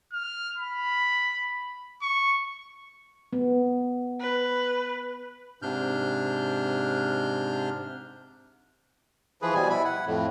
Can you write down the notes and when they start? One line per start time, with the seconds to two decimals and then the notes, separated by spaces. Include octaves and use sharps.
0.12 F6
0.58 B5
2.02 C#6
3.33 B3
4.20 B4
5.62 G#2 C3 D4 F6 G6
9.42 E3 F3 G#4 B4
9.54 B2 G3 G#5
9.70 E4 B5
9.85 F#5
10.06 F2 A2